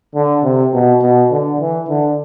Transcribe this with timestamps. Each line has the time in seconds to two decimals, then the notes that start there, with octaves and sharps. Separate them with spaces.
0.15 D3
0.44 C3
0.73 B2
1.02 B2
1.31 D3
1.60 E3
1.89 D3